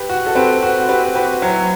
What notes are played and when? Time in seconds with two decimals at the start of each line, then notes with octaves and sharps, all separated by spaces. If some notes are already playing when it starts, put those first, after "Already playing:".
Already playing: G4 B4
0.09 F#4
0.26 A4
0.35 C4 G4 B4
0.62 F#4
0.89 C4 G4 B4
1.15 F#4 G4 B4
1.42 F#3 C4 E4